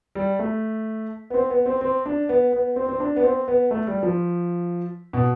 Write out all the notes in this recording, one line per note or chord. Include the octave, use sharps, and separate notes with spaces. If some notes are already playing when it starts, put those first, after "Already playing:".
G3
A3
B3
C4
B3
C4
C4
D4
B3
B3
C4
C4
D4
B3
C4
B3
A3
G3
F3
B2